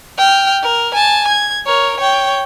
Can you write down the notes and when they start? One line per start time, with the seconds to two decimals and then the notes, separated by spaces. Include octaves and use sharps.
0.18 G5 F6
0.63 A#4
0.94 G#5 A5
1.28 G#6
1.66 A#4 C#5
1.97 C#5 G5